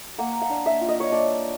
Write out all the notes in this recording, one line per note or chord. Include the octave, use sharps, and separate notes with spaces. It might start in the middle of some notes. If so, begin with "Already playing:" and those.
A#3 F#5
F5
D4
E5
F4
D#5
C#5
D4 D5